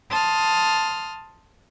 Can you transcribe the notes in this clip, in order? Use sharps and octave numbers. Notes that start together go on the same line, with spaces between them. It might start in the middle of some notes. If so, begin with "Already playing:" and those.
A5 C6 D#6 F6